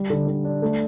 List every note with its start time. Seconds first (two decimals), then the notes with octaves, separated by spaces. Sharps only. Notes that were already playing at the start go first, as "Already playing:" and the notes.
Already playing: G3
0.10 D3
0.27 D3
0.44 D4
0.62 A3